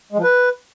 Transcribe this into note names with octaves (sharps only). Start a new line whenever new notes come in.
G#3
F3
B4